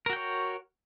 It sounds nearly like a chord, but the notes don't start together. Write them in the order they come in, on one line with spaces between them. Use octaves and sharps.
A#4 F#4 G5 C#5